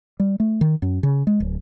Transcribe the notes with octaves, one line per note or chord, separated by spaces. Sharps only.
G3
A3
D#3
F#2
C#3
G#3
D1